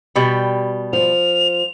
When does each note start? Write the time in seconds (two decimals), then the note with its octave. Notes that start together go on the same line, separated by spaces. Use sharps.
0.16 B2 G3
0.93 F3 F7